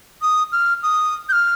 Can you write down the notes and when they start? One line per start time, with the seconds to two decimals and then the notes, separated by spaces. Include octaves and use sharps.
0.22 D#6
0.52 F6
0.83 D#6
1.29 G6
1.32 F6